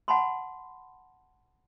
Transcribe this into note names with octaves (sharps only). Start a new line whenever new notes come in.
F#5 A5 B5 C6